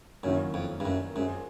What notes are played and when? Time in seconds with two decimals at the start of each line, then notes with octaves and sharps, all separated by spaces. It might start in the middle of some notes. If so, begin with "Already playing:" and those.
0.23 F#2 D#3 F#3 A#3 C#4 E4
0.54 F2
0.80 G2
0.85 F#2
1.16 F#2 G#3 C4 F4 G#4